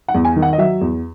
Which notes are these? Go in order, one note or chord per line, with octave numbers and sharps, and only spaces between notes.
F#5
E2
G#5
D#3
F#5
D#5
F#3 E5
E2